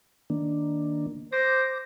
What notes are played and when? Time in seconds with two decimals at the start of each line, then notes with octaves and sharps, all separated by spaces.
0.30 D#3 A#3 D4
1.33 C5 D6 A#6